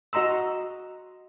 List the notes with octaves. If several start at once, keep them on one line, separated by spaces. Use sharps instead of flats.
F#4 D#5 A#5 C6 E6